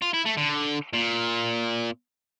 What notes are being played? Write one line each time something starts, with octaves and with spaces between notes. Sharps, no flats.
F4
E4
A3
D3
A#2